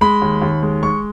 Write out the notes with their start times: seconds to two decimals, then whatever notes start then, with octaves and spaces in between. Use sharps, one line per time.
0.01 G#3 B5
0.22 D#2
0.42 D#2
0.63 G#3
0.83 G#3 C#6